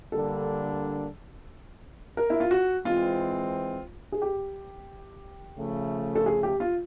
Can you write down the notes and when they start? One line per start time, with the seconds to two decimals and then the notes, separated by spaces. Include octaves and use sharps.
0.12 D3 G3 A#3 D4 A4
2.17 A#4
2.30 E4
2.40 F4
2.51 F#4
2.85 E3 G#3 C4 F4
4.12 G#4
4.22 G4
5.57 C#3 F3 A3
6.15 A4
6.26 G#4
6.43 G4
6.60 F4